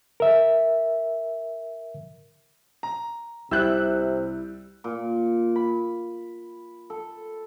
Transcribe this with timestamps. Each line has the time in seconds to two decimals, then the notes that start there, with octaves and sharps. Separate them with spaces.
0.20 A#4 E5
2.83 A#5
3.51 C2 C3 G3 E4 E6 F#6 G6
4.84 A#2
5.56 B5
6.90 A4